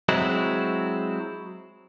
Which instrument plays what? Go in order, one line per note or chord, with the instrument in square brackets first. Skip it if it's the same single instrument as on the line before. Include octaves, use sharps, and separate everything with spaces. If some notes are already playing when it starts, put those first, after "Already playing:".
[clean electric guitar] F#3 G#3 C4 E4